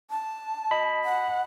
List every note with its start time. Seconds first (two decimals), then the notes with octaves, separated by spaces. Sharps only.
0.10 A5
0.71 D#5 B5
1.05 F#5